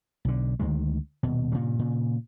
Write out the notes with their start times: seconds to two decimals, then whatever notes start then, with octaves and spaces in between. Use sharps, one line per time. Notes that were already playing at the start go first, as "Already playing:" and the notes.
0.25 B1 D3
0.60 D2 D#3 G#3
1.23 D#1 B2
1.52 G2 A#2 C#3 F#3
1.79 A#2 C#3